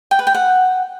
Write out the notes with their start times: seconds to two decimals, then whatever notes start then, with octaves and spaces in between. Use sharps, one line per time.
0.11 G5
0.19 B4
0.27 G5
0.35 F#5